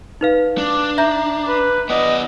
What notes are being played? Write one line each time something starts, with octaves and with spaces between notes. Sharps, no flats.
D#4 B4 F5
D4
E5 A#5 G6
B4
B3 D5 D#5